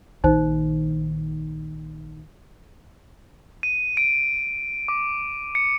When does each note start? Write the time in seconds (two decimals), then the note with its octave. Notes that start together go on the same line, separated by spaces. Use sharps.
0.24 A#1 D#3 D#4 C5
3.63 D#7
3.97 D7
4.88 D6
5.55 C#7